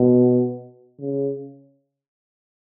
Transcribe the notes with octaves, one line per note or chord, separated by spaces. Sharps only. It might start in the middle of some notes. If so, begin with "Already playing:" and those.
Already playing: B2
C#3